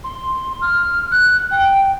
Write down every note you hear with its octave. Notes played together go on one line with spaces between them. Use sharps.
C6
F6
F#6
G5